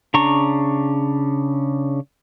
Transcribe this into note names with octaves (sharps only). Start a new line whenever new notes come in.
C#3 D4 A#5 C#6